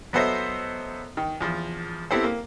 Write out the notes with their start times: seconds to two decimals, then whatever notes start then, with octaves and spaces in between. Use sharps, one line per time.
0.13 F#3 B3 A4 C5 D#5 E5
1.17 D#3
1.40 E2 F3
2.11 B3 C4 E4 G4 A4 C5
2.24 A#3